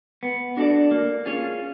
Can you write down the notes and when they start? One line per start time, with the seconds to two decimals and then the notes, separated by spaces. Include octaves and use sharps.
0.23 B3
0.57 D4 F#4 A4 D5
0.91 A#3
1.26 C#4 F4 G#4 C#5